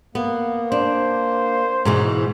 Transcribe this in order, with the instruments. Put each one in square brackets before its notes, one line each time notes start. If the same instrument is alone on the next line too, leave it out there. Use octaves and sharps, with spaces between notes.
[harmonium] A#3 [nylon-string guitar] B3
[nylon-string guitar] D4 [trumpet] C5
[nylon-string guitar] G#2 B2 E3